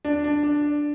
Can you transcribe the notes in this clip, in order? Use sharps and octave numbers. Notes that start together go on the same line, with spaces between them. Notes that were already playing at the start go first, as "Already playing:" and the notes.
D4
D4
D4